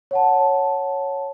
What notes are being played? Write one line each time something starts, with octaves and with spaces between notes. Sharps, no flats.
C#5 F#5 A5